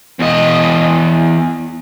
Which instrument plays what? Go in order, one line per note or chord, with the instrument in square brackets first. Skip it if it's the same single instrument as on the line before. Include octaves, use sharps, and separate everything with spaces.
[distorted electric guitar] E2 D#5